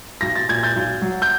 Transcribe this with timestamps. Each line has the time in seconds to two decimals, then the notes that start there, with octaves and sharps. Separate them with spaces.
0.21 B1 A#6
0.35 A6
0.49 A#2 G#6
0.63 G6 A6
0.76 B1
1.02 F#3
1.22 G6